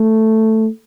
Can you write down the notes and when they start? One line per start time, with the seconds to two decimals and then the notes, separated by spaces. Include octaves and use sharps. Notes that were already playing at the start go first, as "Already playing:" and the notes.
Already playing: A3